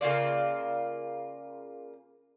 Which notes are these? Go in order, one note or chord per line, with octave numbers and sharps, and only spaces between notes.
C#3 A#3 F4 D5